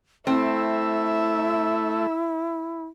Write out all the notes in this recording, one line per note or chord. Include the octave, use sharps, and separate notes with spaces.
A3 C4 E4 E5